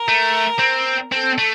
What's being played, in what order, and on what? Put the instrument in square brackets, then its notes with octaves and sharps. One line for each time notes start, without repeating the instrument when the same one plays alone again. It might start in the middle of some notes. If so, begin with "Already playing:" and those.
Already playing: [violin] A#4
[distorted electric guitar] A3
C4
[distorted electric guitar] C4 [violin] A4
[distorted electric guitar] A3